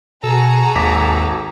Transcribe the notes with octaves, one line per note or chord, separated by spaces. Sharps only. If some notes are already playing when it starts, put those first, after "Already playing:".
B2 F#4 G#4 A4 A#5
G#1 D#2 D6 B6